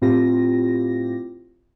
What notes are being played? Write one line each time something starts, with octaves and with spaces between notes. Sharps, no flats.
A2 C4 E4 F4 G4 A#6